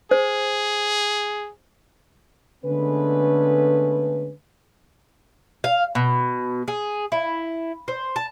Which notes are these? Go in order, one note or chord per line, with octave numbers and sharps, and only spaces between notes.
G#4 C5
D3 G#3 A3 B3 C#4 B4
F5
B2
G#4
E4
C5
A5